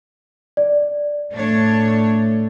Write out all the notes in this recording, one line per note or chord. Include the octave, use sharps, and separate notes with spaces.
D5
A2 A3 D4 C#5